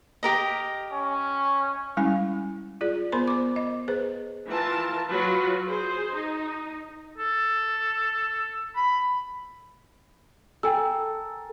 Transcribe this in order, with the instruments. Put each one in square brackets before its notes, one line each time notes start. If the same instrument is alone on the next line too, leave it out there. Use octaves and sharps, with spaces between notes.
[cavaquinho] G4 A#4 D#5
[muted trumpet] C#4
[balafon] G3 G#3 C#4 E4 G#5
F4 G#4 D5
B3 A#4 C5 B5 C6
C5 D6
D#5
G#4 B4 C5
[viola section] E3 F4 A#4 A5
F#3 F4 F#4 B4
G#4 C5
D#4
[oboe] A4
B5
[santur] A4 A#4 [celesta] G5 G#5 E6